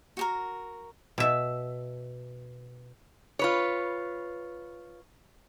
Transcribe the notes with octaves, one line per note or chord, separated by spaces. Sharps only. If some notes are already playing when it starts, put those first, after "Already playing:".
F#4 G4 A#4
B2 E5
F4 B4 C#5